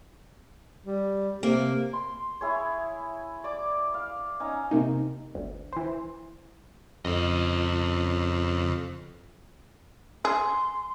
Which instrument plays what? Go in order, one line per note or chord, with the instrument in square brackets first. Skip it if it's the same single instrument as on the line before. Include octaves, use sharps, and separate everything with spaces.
[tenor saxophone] G3
[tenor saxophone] C3 [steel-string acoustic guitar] A#3
[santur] C6
E4 G#4 C#5
D5 D6
F5
C#4 D#4
[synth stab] C3 A#3 D#4
G1 D2
E3 C5
[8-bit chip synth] F2 [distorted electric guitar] C#3 D#5
[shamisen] G#4 [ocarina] C6